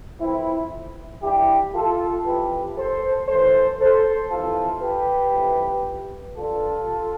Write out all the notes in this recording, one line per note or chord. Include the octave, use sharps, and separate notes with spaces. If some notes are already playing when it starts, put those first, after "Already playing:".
F2 E3 C4 E4
G2 E3 E4 G4
F4 A4
F2 E3 G4 B4
A4 C5
A2 E3 A4 C5
A4 C5
F2 C3 E3 F4 A4
G4 B4
F2 E3
G2 D3 F4 A4